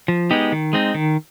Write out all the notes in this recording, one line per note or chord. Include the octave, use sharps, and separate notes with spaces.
F3
G#3 B3 D#4 G4
D#3
G#3 C4 D#4
D#3